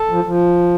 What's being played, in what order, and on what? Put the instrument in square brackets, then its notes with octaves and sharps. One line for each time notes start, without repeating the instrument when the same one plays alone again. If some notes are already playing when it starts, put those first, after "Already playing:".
Already playing: [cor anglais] A4
[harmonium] F3
F3